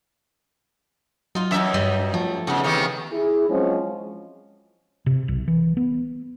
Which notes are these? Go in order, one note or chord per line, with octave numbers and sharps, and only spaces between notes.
F#3 D#4 F4
F#2 E3 D#4 E5
G2 G3 D#5
F3 A3
G#2 C#3 B3
C3 D#3 E3
E4 G#4
F3 F#3 G#3 C4 C#4
C3
B1
E3
B3